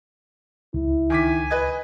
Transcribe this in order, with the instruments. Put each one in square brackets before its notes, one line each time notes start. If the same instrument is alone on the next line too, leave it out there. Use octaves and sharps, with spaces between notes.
[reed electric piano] C#2 [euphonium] E4
[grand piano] D#3 D6 B6 [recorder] G#5
[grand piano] B4 D#5 G#6